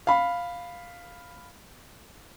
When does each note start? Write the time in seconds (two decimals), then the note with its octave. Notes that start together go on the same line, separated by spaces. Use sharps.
0.07 F5 B5